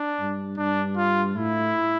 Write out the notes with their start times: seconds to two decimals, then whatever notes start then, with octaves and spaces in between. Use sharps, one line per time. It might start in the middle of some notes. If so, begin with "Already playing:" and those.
Already playing: D4
0.20 G2
0.58 G2 D4
0.97 F4
1.35 A2 E4